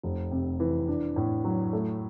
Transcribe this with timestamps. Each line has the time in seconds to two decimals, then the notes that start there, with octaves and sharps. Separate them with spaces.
0.03 F1
0.31 C3
0.60 E3
0.88 D4
1.16 A2
1.45 F#3
1.73 A3